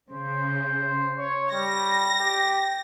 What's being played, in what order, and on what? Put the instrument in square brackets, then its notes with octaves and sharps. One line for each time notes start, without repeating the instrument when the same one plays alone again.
[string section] C#3 [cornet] C5
[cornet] C#5
[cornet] G3 [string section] A#6
[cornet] G4